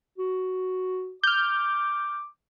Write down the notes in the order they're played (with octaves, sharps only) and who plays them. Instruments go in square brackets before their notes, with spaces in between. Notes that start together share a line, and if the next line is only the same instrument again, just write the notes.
[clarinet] F#4
[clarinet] D6 [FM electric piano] F6 G6